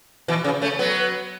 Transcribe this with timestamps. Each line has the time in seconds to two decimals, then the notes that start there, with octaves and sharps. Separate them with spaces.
0.28 B2 E3
0.44 C#3
0.62 A3 C#4
0.79 F#3 B3